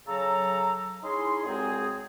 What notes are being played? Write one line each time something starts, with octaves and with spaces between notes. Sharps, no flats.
C#3 F#3 A4 A#5
C#4 D#4 E4 G#4 G#5 C6
C2 F#3 G#3 C4 G#4